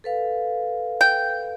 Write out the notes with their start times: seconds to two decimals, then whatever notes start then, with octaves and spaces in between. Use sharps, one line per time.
0.04 A4 B4 F5
1.01 G5